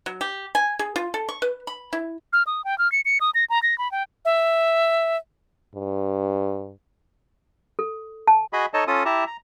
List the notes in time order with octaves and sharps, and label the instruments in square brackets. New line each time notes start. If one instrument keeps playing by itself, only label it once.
[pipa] F#3
G4
G#5
G#4
F4
A4
C#6
B4
B5
E4
[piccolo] F6
D#6
G5
F6
C#7
C#7
D#6
A#6
A#5
A#6
B5
G5
E5
[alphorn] G2
[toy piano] A4
A5
[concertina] F#4 G#4 D#5 B5
D#4 A4 C#5 D#5 A5
C#4 F4 A4 D#6
E4 G4 E5 A5 A#5
A#5